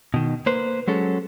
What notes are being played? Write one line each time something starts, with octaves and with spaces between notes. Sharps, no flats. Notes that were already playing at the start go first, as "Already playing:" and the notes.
B2 D#3
A#3 B4 C5
F#3 G#3 C#4 A4